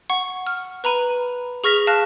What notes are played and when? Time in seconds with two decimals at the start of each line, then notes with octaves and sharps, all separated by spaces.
0.10 F#5 C#6
0.47 F6
0.84 B4 A#5 B5 D#7
1.64 G#4 C#6 F6 A#6 B6 F7
1.87 F5 A5 F6 F#6 A#6